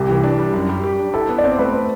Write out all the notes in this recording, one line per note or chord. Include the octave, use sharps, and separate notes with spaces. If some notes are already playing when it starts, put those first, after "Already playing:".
Already playing: C2 G4
E3
D4
G3
F#2
G3
G4
D4
E4 A4
B3
D5
C4 C5
A3 B4